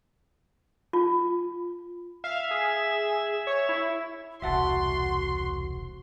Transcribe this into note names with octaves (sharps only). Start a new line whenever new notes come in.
F4
E5 F5
G#4
C#5
E4
E1 C2 F#4 E5 F#5 A5 C6